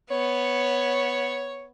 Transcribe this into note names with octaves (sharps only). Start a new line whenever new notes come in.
B3 C#5